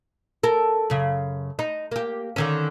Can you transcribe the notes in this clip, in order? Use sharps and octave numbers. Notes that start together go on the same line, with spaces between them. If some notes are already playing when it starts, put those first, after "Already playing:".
A4 A#4
F#2 C#3
D#4
A#3 G4
D3 D#3 C#4